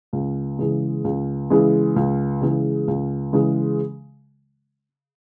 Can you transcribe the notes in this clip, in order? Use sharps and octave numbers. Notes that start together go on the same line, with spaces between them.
C#2
C#3 E3 G#3
C#2
C#3 E3 G#3
C#2
C#3 E3 G#3
C#2
C#3 E3 G#3